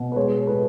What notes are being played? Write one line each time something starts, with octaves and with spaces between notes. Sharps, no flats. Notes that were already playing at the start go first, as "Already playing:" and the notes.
Already playing: B2
B4
G#3 C#5
A2 B4